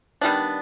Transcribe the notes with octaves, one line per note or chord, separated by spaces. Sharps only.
D#3 G3 B3 D4